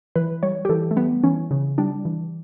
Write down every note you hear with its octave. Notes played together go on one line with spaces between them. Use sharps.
E3 B4
G3 C#5
G4
E3 A4
A3
G3 B3
E3 C#4
C#3
G3 D4
E3